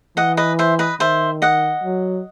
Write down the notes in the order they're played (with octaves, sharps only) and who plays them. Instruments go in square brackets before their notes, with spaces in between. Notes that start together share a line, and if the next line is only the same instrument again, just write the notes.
[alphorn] E3 [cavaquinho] D#5 F#5
[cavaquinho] B4 D#5
C5 E5
B4 D#5
[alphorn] D#3 [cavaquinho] C5 E5
[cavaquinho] D#5 F#5
[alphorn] F#3